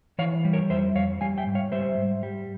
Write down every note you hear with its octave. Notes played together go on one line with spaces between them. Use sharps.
E3 C#5 F5
G3
A#4 C#5
F2 C5 E5
F2 C#5 F5
G3 F5 G#5
E5 G5
G#2
C#5 F5
G3 C5 E5
G#2
G3